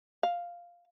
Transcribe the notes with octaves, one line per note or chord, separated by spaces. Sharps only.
F5